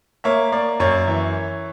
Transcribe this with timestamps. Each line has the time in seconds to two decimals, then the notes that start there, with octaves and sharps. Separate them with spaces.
0.24 A#3 C#5 E5
0.52 A#3 D5
0.80 F#2 C#5
1.07 E3